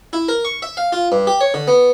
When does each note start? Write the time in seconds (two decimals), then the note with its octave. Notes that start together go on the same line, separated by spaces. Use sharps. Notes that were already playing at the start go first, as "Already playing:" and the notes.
0.13 E4
0.29 A#4
0.45 C#6
0.62 E5
0.77 F5
0.93 F4
1.12 G2
1.27 G4
1.41 C#5
1.54 D3
1.68 B3